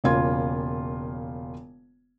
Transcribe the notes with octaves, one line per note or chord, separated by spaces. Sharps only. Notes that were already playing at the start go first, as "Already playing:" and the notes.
E1 C#3 A#3 F4 G#6